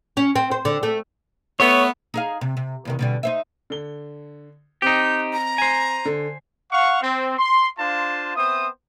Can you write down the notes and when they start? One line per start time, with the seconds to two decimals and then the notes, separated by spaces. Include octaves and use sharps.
0.17 C#4
0.36 C4
0.51 C5
0.65 D3
0.83 A3
1.60 A3 B3 C#5
2.14 D#4 G#4 F5
2.41 C3
2.57 C3
2.85 E2 C3 D#3
2.99 B2 D3 G3
3.23 D#4 C5 E5
3.70 D3 G7
4.82 C4 D#4 G4 D#5 G6
5.33 A#5
5.58 C5 G#5
6.05 D3
6.71 F5 F#5 C#6
7.01 C4
7.37 C6
7.78 D4 F4 C5 F5 A5 C6
8.36 B3 C4 C5 E5 D#6